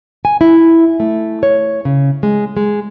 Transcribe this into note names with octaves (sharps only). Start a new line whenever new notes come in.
G#5
E4
A3
C#5
C#3
G#3
G#3